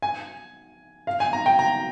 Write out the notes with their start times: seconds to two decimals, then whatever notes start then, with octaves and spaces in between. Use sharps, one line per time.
0.02 G#5
1.07 F5
1.20 G#5
1.33 A#5
1.46 G5
1.59 A#5